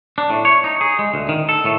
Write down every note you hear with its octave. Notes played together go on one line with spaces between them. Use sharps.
D4
A2
C#5
D#4
G#4
G#3
D2
D#3
A4
A2